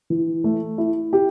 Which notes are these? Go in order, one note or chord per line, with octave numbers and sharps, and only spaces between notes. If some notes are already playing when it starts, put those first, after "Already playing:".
E3
A3
E4
G4